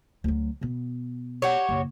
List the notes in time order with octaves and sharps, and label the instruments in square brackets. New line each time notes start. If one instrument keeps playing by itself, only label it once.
[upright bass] D2 F#3
B2 B3
[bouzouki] F#4 G4 C#5
[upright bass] F#1 B1